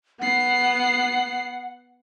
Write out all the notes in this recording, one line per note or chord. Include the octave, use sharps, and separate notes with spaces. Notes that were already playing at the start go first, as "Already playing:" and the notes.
B3 F#5 C7